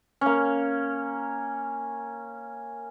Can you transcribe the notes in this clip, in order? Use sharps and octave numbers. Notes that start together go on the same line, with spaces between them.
A#3 C#4